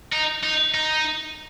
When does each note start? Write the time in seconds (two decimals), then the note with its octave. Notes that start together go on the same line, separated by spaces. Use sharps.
0.13 D#4
0.44 D#4
0.74 D#4